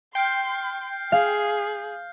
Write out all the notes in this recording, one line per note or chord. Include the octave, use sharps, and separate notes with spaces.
G5 C6 F6 G6 C7
G#4 F5